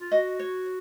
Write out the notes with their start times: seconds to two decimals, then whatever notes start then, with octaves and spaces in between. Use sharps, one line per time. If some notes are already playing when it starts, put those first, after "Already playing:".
0.01 F4
0.11 F#4 D#5
0.39 C#5